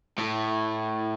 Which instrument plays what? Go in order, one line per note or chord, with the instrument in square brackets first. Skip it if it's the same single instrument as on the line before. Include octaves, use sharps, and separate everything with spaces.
[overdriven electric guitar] A2